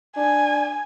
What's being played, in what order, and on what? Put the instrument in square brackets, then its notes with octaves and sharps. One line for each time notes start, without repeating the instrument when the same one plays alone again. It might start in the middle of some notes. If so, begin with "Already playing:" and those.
[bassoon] D4 [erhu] G#5